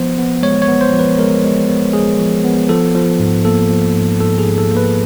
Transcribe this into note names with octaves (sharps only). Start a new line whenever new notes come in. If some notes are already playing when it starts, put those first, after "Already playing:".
Already playing: F3 B3 C5
B3
G#3 C#5
C#5
B3
C5
F3
B4
G#3 A#4
G#3
B3
G#3 G#4
F3
B3
F3 A4
F3
G#2
A#3 A4
F3
G#2
G#2 A4
G#4
G#2
A4
A#3
B4